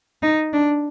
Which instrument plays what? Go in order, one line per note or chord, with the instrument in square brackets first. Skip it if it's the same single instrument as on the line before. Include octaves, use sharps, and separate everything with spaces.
[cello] D#4
D4